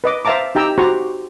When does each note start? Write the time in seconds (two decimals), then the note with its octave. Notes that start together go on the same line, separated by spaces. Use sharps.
0.04 B4 D#5 D6
0.25 C5 E5 F5 A5 A#5 D6
0.55 D#4 G4 G5 A#5 E6
0.78 F#4 G4 C5 A#5 C6 C#6